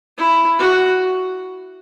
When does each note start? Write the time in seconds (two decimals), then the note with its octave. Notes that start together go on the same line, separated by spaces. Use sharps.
0.18 E4
0.59 F#4